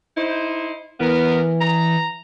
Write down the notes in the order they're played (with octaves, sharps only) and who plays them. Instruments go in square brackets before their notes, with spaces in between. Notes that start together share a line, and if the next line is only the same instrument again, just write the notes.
[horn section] D#4 E4 C5
[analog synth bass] E3 [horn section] B3 A#4
[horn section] A#5